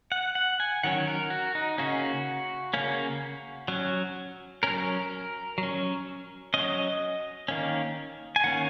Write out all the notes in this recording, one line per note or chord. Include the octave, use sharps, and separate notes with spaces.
F#5
F#5
G#5
D#3 F#3 C#4 F#5
A#4
F#4
D#4
C#3 A#3 C#4 F#4
C#3 A#3 C#4
F#3 C#4
F#3 C#4 A#4
F#3
C#4
F#3 C#4 D#5
D#3 A#3 C#4
G#5
D#3 A#3 C#4 F#5